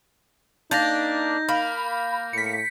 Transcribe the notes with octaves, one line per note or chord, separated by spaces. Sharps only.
A#3 D4 D#4 G6 A#6
A#3 B5
A2 B6 C#7